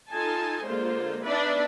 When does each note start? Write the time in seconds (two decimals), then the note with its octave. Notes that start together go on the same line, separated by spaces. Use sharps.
0.12 D#4 F4 A4 G#5 A5
0.64 D3 G#3 A#3 F4 C5
1.25 B3 D4 D#4 B4 D5 E5